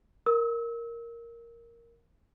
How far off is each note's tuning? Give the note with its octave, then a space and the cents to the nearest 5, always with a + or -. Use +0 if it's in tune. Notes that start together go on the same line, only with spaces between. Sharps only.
A#4 +0 E6 -30